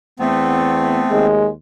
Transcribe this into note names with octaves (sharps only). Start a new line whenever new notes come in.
E2 A3 B3 C4
D#2 G#3